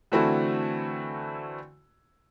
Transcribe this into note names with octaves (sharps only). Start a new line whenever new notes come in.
D3 E3 A3 C4 E4 F#4